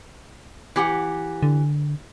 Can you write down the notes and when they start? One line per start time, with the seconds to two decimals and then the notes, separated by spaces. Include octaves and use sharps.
0.76 E3 G4 F#5
1.43 D3